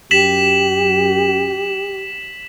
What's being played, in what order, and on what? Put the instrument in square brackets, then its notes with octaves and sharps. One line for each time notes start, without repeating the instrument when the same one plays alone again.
[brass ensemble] F#2 [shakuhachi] G4 [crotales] B6 E7 F#7